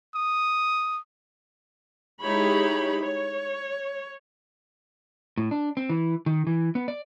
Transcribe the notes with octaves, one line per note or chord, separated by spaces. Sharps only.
D#6
G#3 D#4 E4 G4 C#5 B5
C#5
A2
D4
C4
E3
D#3
E3
B3
D5